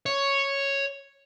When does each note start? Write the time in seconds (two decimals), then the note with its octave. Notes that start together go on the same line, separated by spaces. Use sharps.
0.06 C#5